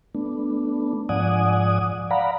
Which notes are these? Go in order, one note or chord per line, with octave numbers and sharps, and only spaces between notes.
A3 B3 D4
G#2 F3 D5 F#5 G#5 D#6
D5 F5 F#5 A#5 B5